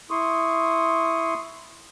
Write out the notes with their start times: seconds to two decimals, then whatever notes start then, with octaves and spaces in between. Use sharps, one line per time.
0.10 E4 C6 C#6 D#6